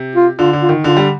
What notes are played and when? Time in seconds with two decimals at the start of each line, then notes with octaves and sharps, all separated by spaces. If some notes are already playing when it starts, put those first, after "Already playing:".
Already playing: C3
0.16 F4
0.39 D3 F4
0.53 D3
0.62 F4
0.69 D#3
0.84 D3 F4
0.97 G3